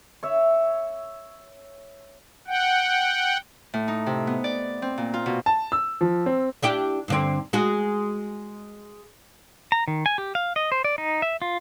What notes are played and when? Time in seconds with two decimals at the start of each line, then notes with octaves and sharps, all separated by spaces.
0.23 C#5 E5
2.48 F#5 G5
3.74 A2
3.88 D#4
4.06 C3
4.27 B3
4.44 D5
4.82 C4
4.98 A#2
5.14 F4
5.26 B2
5.46 A5
5.72 E6
6.01 F3
6.26 C4
6.63 D4 E4 G4
7.08 G2 D3 C4
7.53 G#3 F#4 G#4
9.72 A#5
9.88 D#3
10.06 G#5
10.18 G4
10.35 F5
10.56 D#5
10.72 C5
10.84 D5
10.98 D#4
11.22 E5
11.42 F4